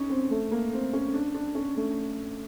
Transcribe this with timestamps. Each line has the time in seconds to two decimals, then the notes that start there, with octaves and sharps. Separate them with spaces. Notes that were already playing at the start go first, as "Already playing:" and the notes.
Already playing: C#4 D#4
0.10 C4
0.31 A3
0.52 A#3
0.73 C4
0.93 C#4
1.14 D4
1.34 D4
1.55 C#4
1.77 A3